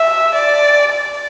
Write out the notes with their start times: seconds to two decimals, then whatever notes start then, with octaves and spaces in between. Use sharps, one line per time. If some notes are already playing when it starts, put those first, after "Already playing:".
Already playing: E5
0.35 D5
0.93 D5